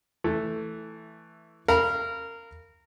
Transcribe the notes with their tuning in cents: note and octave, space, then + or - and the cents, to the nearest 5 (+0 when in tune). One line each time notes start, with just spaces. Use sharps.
E3 +0 A3 +5
A#4 -20 F5 -10 B5 -25